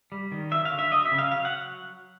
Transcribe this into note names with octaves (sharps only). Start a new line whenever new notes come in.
G3
D#3
F#3 E5
F5
D3
E5
F#3 D#5
E5
C#3
F5
F#3 F5
F#5